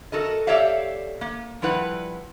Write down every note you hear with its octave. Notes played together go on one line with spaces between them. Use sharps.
F#4 A4 A#4 D#5
G4 A4 C#5 D5 E5 F5
A#3
F3 G3 E4 B4 F#5